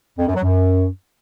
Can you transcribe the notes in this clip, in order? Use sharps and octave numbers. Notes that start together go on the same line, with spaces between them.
F2
F#2
F#3
F#2